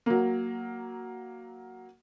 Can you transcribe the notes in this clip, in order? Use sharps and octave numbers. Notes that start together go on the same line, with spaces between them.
F#3 A#3